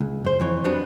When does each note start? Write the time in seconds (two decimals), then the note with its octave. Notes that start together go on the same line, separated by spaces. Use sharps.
0.01 C#2
0.25 F#2 C5
0.40 F2 E3 C#5
0.64 F#3 G3 B3 C4 D4 F#4